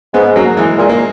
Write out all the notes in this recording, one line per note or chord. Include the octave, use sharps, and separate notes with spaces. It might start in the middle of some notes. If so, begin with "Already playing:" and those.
G#2 G#3 B3
F#3 A#3
E3 G#3
A#2 G#3
A#3